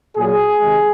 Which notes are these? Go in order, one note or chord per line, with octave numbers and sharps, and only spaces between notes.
A#2 F#3 G#4
C3 D#3 G#3